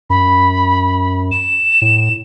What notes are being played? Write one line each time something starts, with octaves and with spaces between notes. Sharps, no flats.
F#2 B5
E7
A2